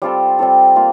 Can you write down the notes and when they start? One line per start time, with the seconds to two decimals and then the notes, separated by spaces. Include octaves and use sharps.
0.02 G3 C4 F4 A4
0.39 G3 C4 F4 A4
0.76 A#3 F4